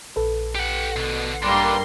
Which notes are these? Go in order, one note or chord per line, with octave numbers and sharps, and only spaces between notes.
A#1 A4 B4
G4 F#5
B2 D3
G2 G3 A#3 D4 D#4 A#4 C6